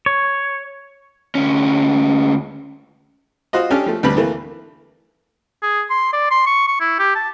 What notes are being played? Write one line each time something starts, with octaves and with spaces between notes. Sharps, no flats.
C#5
D2 C#4
F4 F#4 C5 D#5
C#4 D4 G4 A4 G5 F6
F3 A3
D2 C3 G3 B4 B5
E3 A3 A#3
G#4
C6
D5
C6
C#6
C#6
E4
G4
A5